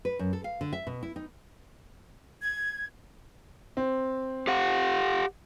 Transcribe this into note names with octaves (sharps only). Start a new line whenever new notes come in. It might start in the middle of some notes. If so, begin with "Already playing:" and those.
B4
F#2
A4
F5
D3
E5
B2
E4
D#4
G#6
C4
G4 F5 F#5